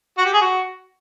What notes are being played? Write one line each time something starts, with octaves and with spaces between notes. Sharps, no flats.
F#4
G4
G#4
F#4